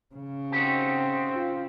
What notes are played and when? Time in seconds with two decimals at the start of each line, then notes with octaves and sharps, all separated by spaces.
0.15 C#3
0.52 C4 D#4 F#4 G4
1.35 F4